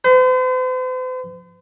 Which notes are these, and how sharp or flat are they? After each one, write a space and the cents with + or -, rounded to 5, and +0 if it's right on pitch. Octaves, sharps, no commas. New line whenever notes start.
C5 -45